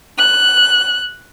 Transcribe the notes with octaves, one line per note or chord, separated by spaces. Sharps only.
F#6